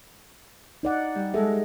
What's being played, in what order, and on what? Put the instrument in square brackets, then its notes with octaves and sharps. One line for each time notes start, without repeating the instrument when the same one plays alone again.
[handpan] D#4 D5 F#5
[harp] G3
[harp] G#3 D#4 [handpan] G#4 A4 E5